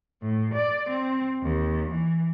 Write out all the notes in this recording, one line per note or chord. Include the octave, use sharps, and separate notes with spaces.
A2
D5
C4
D#2
E3